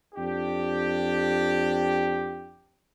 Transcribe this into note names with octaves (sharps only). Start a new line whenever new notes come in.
F2 D4 G4